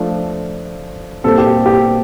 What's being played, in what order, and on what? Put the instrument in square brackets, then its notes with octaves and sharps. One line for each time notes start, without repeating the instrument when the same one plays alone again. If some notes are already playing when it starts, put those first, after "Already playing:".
Already playing: [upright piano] F3 A3 D4 F4
A#2 G3 C4 A4
G4
G4